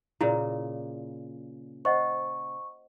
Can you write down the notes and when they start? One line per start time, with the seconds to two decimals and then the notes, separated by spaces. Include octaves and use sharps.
0.21 A#2 C#3 E4 D5
1.85 C5 D#5 F#5 C#6